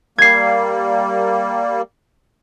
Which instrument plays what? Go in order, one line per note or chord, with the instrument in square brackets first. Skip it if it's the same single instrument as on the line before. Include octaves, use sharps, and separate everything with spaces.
[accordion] G3 A#3 [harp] G#6 C7